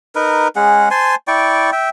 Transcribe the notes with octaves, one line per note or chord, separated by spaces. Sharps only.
D#4 A#4 B4
G#3 C#4 G#4 F#5
C5 G#5 A5 C6
E4 D5 G5 C#6
E5 G5